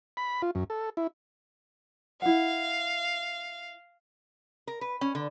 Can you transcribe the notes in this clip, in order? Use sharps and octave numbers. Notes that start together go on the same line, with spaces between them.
B5
F4
F#2
A4
E4
E4 F5 F#5
A#4
B4
C#4
D3